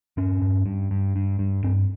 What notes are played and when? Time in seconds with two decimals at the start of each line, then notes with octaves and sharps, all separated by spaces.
0.17 G2 C#4
0.42 G2
0.66 G2
0.91 G2
1.16 G2
1.39 G2
1.64 G2 C4